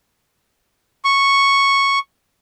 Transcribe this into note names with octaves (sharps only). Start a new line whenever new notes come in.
C#6